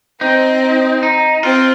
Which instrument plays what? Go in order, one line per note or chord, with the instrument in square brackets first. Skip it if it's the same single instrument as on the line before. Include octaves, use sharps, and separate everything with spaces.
[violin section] C4 [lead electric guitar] D#4
[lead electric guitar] D#4
[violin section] C4 [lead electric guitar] F4